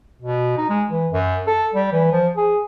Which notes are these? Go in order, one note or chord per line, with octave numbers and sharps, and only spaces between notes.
B2
D#4
G#3
E3
F#2
A4
G3
E3
F3
G#4